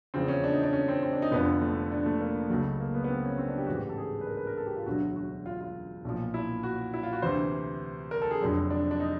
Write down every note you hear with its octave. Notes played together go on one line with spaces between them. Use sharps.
E2 C#3 F3 C4
C#4
D4
D#4
D4
C#4
C4
C4
D4
D#4
F1 F2 D3 F3 B3
A3
D4
A3
A#3
C#2 C#3 F#3 A3
A#3
B3
B3
C4
C#4
C4
D4
G4
A1 G#2 E3 F#4
G4
A4
G#4
B4
A#4
B4
A#4
A4
G4
F4
E1 D2 D3 F#3 F#4
F#4
F4
F4
B1 A#2 F3
E4
F#4
E4
F4
F#4
D2 C3 E3 C5
A#4
A4
G#4
F1 F2 D3 F#3
D4
D4
D#4